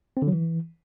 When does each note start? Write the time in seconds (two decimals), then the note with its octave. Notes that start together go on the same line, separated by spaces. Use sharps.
0.17 C4
0.22 D3
0.27 F#3
0.33 E3